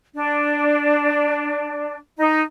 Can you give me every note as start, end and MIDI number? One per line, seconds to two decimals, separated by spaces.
0.15 1.97 62
2.17 2.42 63